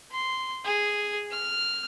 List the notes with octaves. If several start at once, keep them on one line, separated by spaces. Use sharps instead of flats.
C6
G#4
F6